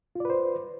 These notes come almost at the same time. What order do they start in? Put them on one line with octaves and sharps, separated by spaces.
F4 D5 B4 C5